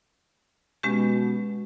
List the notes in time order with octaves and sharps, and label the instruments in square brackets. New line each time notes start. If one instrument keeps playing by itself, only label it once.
[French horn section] B2 [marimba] G#3 C#4 G4